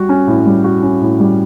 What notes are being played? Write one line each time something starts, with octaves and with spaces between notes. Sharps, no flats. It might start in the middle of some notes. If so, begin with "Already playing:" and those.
Already playing: G3 F#4
C#4
A2
G3
F#4
C#4
A2
G3